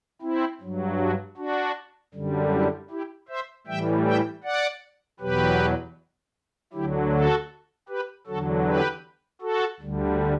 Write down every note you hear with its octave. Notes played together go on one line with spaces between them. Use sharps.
C4 E4
G2 F#3
D4 F#4
D4 F#4
F#2 D3 G3
E4 G4
E4 G4
C5 E5
A2 E3 G3 E5 G5
E5 G5
D5 F#5
E2 B2 F#3 G4 B4
D2 D3 F#3 E4 G4
F#4 A4
G4 B4
E2 D3 F#3 F#4 A4
G4 B4
F#4 A4
D2 D3 G3